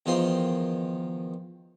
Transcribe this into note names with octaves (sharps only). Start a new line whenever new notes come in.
E2 D#3 F3 C6